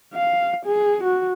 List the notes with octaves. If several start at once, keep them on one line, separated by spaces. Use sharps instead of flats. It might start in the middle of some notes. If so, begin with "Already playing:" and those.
F5
G#4
F#4